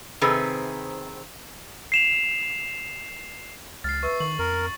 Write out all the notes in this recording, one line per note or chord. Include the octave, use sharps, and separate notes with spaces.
C3 D#3 C4 G#4 B4
C7 E7 F7
C#2 F6 A6 C7
B4 E5 C#6 E6
D#3 C#6 F#7
F2 A#4